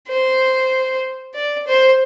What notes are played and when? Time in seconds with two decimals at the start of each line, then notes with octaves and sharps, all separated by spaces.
0.08 C5
1.34 D5
1.67 C5